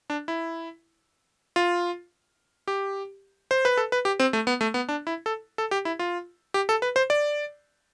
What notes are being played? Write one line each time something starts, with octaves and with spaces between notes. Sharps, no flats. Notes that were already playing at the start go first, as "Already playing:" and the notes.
D4
E4
F4
G4
C5
B4
A4
B4
G4
C4
A3
B3
A3
B3
D4
E4
A4
A4
G4
E4
F4
G4
A4
B4
C5
D5